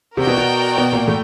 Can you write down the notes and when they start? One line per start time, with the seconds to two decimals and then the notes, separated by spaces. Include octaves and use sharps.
0.17 C3 C4 F#4 A#4 D5 G5
0.27 B2 B3
0.37 B2 B3
0.77 B2 B3
0.93 A#2 A#3
1.07 A2 A3